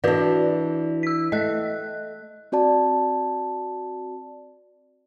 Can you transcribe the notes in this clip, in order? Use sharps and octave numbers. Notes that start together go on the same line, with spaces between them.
E3 D4 F#4 B4 D5
E6 B6
A3 D#5 F#6
C4 F#4 D5 A5